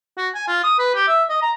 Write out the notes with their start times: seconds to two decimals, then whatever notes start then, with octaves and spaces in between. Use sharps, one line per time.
0.17 F#4
0.35 G#5
0.47 F4
0.63 D#6
0.79 B4
0.95 G4
1.08 E5
1.29 D#5
1.42 A#5